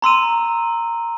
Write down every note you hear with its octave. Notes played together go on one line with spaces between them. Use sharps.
A#5 C6 E6 D#7